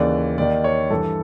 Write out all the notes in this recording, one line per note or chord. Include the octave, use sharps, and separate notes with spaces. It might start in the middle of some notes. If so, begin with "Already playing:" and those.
Already playing: D#2 C#3 E3 D5
D#2 D#3 D5
C#5
G2 E3 A4